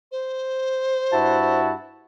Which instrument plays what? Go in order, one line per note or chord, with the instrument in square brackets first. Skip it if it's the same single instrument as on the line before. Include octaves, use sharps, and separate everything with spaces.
[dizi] C5
[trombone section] G2 E4 F#4 [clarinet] A5